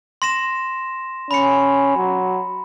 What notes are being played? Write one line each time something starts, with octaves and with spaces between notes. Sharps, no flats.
C6 A#6 E7
C#4 B5 C#7
F#3